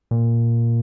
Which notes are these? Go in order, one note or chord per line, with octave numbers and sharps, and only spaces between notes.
A#2